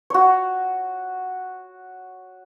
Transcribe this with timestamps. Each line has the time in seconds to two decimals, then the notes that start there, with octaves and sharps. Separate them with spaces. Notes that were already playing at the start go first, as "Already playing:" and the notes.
0.10 F#4 C#5